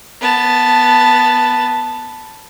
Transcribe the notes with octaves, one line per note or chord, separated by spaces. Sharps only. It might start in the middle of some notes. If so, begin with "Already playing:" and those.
B3 A5